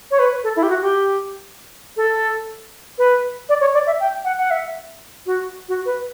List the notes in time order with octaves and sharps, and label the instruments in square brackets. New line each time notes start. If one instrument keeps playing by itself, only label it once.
[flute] C#5
B4
A4
E4
G4
F#4
G4
A4
B4
D5
C#5
D5
E5
G5
F#5
F#5
E5
F#4
F#4
B4